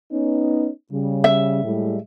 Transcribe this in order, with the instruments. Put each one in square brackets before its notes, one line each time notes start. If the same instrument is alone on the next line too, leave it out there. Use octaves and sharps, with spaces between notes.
[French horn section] B3 C#4 D#4
C#3 G3
[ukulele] E5
[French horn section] A2 G3 G#3